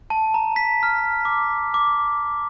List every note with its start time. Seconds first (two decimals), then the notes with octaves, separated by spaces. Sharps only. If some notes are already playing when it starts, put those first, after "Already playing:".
0.10 A5
0.34 A#5
0.56 B6
0.83 F6
1.25 D6
1.74 D6